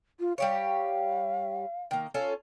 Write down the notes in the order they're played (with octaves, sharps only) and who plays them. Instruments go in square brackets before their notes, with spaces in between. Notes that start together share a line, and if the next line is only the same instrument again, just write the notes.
[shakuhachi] F4
[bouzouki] G3 G4 C#5 [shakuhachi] F5
[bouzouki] D#3 A#3
C#4 F4 A4